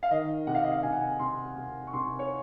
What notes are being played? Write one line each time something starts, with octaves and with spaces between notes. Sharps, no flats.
F5
D#3 D#5
C3 F#5
F5
D#5
F5
C3 G#5
F#5
G#5
C3 C6
C3
C#6
C3 C6
C#5